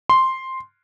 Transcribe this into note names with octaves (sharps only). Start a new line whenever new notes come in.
C6